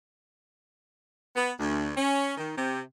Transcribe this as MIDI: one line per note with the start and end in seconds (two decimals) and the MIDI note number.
1.36 1.51 59
1.60 1.92 38
1.97 2.33 61
2.37 2.53 51
2.57 2.81 48